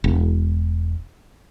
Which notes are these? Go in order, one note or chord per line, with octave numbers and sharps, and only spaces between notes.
E1